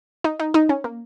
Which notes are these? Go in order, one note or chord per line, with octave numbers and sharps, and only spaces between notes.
D#4
D#4
D#4
C#4
A#3